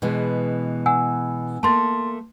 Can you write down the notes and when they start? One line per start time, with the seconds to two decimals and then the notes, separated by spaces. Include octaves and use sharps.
0.02 B2 E3 G#3
0.86 F#5 G#5 E6
1.63 A3 A#3 A5 C6 A6